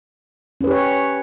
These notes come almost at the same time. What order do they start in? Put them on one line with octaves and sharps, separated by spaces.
C#4 B4 G4 C#5